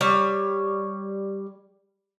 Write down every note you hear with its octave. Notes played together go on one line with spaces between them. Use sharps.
G3 C#5